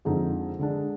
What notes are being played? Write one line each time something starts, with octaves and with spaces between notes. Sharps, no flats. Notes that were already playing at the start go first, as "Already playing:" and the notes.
F2 D3 G#3 D#4 G#4
D3 G#3 D4